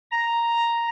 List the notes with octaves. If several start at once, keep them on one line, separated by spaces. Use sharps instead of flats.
A#5